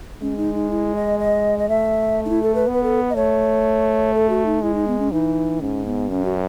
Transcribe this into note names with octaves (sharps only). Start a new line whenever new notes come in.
G#3 C#4
D#4
D#4
E4
D#5
D#5
D#5
A3 E5
D#4
E4
A4
B4
B3
B4
A4
D#5
A3 C#5
A4
F#4
D#4
G#3 E4
D#4
B3
C#4
E3 D#4
G#2 C#4
B3
F#2 C#4
F#4